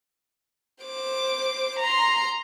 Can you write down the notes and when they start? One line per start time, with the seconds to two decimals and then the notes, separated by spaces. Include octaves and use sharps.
0.85 C5 D6
1.79 A#5 C6